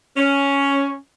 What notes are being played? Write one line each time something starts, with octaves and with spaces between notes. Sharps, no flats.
C#4